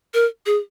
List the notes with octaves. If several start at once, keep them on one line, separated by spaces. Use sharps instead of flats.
A#4
G#4